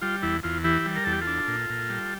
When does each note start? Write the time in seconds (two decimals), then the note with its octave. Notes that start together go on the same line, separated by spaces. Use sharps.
0.02 G3 F4
0.23 E2 E4
0.43 E2 F4
0.64 E3 E4 G4
0.86 G3
0.96 A#4
1.04 E2 A4
1.12 G4
1.21 F4 A4
1.27 D4
1.48 A#2
1.70 A#2
1.90 G3